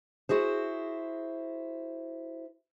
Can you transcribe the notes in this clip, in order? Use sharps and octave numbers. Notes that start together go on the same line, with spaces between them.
E4 F#4 G#4 C5